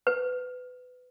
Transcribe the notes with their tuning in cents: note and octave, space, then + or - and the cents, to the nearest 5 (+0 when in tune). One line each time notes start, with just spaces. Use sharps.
B4 +20